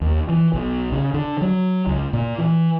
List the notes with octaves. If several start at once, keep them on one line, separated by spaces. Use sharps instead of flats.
D#2
E3
B1
C#3
D3
F#3
C#2
A#2
E3